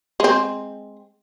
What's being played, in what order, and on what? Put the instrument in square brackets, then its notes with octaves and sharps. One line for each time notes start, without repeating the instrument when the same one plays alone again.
[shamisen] G#3 C4